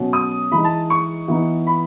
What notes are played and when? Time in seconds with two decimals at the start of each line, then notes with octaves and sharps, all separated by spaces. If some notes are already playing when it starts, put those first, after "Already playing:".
Already playing: B2 F#3 C#4
0.13 D#6
0.52 E3 G#3 D#4 B5
0.64 A5
0.90 C#6
1.28 E3 B3 D#4
1.67 B5